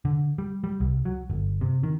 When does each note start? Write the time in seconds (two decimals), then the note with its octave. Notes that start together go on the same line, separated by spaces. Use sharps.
0.05 D3
0.38 G3
0.64 G3
0.80 C2
1.05 F#3
1.30 G1
1.61 C3
1.83 D#3